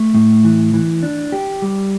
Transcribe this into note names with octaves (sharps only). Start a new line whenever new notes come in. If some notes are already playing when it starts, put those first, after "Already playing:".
Already playing: A3
A2
E3
E3
D4
G4
G3